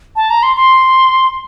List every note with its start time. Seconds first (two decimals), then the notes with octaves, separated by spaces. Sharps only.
0.16 A5
0.30 A#5
0.43 C6
0.56 C6